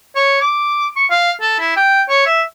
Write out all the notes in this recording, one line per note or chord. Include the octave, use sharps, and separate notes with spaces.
C#5
D6
C#6
F5
A4
E4
G5
C#5
E5